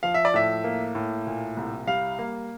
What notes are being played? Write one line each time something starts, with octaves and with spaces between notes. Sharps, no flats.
F3 F5
E5
D5
A2 E5
A#3
A2
A#2
C2
G3 F5
A#3